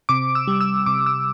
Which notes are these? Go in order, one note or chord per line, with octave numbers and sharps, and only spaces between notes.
C3 D6
E6
G3
E6
C3 D6
E6